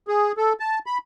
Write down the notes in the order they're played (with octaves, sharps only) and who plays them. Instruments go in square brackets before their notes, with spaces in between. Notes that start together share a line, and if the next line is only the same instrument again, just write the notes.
[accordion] G#4
A4
A5
B5